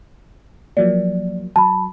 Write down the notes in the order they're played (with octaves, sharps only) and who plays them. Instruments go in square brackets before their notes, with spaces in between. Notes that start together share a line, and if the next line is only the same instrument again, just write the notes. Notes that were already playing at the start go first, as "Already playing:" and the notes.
[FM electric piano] F3 F#3 A#3 [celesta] D5
[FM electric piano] F#3 [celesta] A5 B5